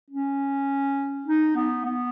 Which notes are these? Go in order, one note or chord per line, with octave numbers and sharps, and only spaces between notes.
C#4
D#4
B3
B3